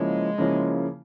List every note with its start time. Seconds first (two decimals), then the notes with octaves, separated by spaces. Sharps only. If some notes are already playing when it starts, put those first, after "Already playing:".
Already playing: C#3 F3 G#3 A#3 C#4 E4
0.38 C#3 F3 A#3 C#4 E4